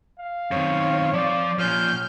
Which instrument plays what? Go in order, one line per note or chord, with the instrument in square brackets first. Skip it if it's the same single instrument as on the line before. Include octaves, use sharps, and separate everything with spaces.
[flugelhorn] F5
[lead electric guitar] F#2 D#3 [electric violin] C4 C#5
[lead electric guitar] F3 F5 [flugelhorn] D5
[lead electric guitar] A#2 F3 [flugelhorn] C#4 [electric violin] F6 G6